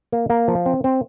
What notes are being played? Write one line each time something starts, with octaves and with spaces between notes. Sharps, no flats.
A#3
A#3
F3
C4
C4